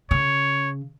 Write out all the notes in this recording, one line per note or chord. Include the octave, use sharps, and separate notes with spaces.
C#3 C#5